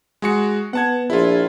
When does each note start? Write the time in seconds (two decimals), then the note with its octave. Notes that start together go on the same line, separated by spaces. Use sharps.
0.22 G#3 F#4 C#7
0.73 B3 F#5 A5 G#6
1.10 A#1 E4 F4